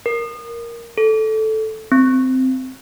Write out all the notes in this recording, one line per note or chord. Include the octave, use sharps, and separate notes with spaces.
A#4
A4
C4